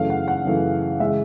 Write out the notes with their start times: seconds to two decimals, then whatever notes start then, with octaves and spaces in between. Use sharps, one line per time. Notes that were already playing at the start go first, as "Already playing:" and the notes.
Already playing: F#2 C#3 E3 A3 F5
0.10 F#5
0.28 F#5
0.46 F#2 C#3 E3 A3
1.00 C#3 E3 G#3 E5